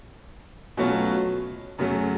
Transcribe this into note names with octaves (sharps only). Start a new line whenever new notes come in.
B2 F#3 A3 C#4 F4
F#2 C#3 F#3 A3 C#4